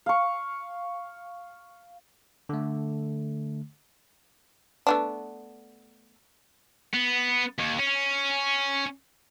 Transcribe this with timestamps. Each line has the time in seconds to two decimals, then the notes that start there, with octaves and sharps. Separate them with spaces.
0.06 F5 C#6
2.49 D3 A3
4.87 A3 B3 D4
6.94 B3
7.60 D#2
7.80 C#4